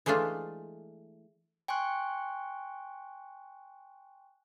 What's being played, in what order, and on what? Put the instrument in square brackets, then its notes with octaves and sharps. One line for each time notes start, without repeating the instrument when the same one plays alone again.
[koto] E3 G#3 A3 D4 F4
[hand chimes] G5 G#5 C6 C#6 F#6